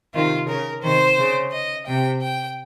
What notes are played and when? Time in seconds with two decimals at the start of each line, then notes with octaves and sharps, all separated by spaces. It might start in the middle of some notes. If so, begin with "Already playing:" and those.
0.13 C3 D#3 F4
0.49 C#3 A#4
0.83 C3 D#3 C5
1.18 C#3
1.52 D#5
1.86 C3 G5
2.22 G5